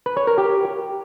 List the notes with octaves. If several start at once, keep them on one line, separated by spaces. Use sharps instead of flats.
B4
C#5
A#4
G4